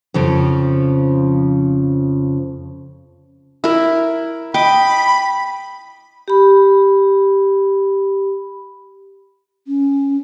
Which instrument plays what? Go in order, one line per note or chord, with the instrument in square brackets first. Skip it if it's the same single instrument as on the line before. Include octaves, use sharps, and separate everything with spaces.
[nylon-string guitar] F2 C#3 F3
[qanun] E4 A#4
[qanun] D#5 G5 D6 [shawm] B5
[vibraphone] G4 B5
[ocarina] C#4